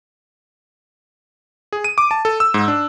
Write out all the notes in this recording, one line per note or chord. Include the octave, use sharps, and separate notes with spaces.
G#4
D#7
D6
A5
A4
E6
G#2
D4